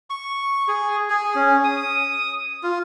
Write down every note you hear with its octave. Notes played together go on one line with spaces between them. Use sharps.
C#6
G#4
G#4
C#4
D#6
F4